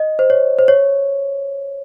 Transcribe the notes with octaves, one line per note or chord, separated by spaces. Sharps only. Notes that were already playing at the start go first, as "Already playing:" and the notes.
Already playing: D#5
C5
C#5
C5
C#5